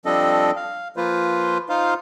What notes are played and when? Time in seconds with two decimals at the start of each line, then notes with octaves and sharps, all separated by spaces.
0.06 F3 G3 C4 D4 A4 D#5
0.56 F5
0.97 F3 A#3 F4 B4 C5
1.69 D#4 F4 C5 F5